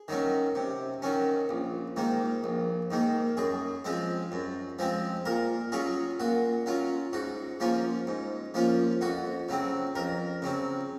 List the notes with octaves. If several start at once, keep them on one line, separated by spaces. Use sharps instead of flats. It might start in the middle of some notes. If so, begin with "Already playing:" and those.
Already playing: G#4
D#3 F#3 C#4
C3
D#3 F#3 C#4
A#1
G#2 D#3 A#3
A#1
G#2 D#3 A#3
F#2 G#4
F3 G#3 C4
F#2
F3 G#3 C4
A#2 A#4
F#3 C#4 F4 G#4
A#2 F#4
F#3 C#4 F4
G#2 F#4
F3 A#3 C#4 F4
G#2
F3 A#3 C#4 F4
F2 F#4
C#3 F#3 C4
F2 A#4
C#3 F#3 C4